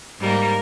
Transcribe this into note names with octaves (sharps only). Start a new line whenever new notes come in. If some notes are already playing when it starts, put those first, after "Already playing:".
G#2 G3 A#3 A#4